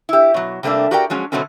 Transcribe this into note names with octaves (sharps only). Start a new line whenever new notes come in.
E4 G4
B2 F#3
C3 G3 A3 A#3 D4
F#4 G4 A#4 D5 E5 G5
F3 F#3 G#3 C#4
B2 D3 F#3 A3 C4 C#4